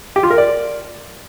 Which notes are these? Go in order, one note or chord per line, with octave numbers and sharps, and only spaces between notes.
G4
F4
A#4
D5